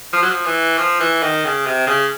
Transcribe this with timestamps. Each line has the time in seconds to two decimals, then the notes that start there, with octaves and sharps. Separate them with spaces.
0.13 F3
0.22 F#3
0.30 F3
0.46 E3
0.78 F3
1.00 E3
1.23 D#3
1.45 C#3
1.66 C3
1.87 C#3